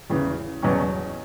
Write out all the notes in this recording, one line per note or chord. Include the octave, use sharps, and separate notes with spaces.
E2 C#3 E3
E2 B2 F#3 C#4